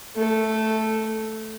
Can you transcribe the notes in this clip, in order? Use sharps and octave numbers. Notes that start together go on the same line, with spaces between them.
A3 A4